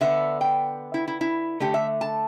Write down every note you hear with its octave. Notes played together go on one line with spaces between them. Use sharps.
D3 B3 E5
G5
E4
E4
E4
D3 A3 G4
E5
A5